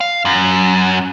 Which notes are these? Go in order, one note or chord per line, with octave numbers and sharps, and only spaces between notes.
F5
F#2